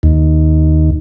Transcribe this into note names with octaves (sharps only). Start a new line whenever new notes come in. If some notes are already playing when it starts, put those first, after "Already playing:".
D#2